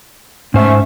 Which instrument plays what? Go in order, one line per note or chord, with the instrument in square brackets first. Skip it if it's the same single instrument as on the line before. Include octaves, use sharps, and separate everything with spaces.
[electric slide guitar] G#2 C5 E5 [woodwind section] A3 C#4